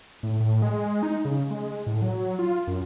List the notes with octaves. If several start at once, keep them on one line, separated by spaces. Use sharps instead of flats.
A2
A2
G#3
D#4
C#3
G#3
A2
F#3
F4
F#2